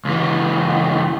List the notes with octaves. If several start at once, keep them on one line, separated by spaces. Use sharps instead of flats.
C#2 E3